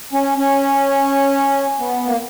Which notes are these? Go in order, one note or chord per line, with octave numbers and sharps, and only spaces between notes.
C#4
C#4
B3
A#3